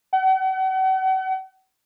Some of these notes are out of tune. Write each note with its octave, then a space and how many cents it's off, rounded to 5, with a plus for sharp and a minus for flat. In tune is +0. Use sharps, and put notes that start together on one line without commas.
F#5 +40